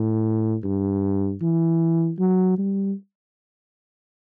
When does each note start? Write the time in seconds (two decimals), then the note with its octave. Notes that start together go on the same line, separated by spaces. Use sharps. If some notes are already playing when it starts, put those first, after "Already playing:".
Already playing: A2
0.64 G2
1.42 E3
2.19 F#3
2.58 G3